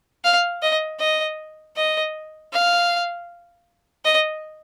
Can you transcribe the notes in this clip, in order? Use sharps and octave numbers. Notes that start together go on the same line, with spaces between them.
F5
D#5
D#5
D#5
F5
D#5